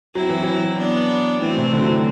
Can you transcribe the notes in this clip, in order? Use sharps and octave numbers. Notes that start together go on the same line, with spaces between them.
F#3 C4 E4
E3
F#3
B3 D4
E3 A3 C4
C3
D3
F#3
E3